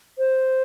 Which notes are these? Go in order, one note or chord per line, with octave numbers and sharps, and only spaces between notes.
C5